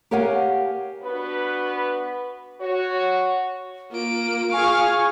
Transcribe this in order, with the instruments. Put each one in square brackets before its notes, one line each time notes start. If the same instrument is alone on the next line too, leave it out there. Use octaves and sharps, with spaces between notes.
[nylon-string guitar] G4 A#4 C#5 F5 F#5 G#5
[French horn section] B3 D4 F#4 B4
F#4 C#5
[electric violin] A#3 D7 [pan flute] F4
[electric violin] G#4 F5 [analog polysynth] G#5 C#6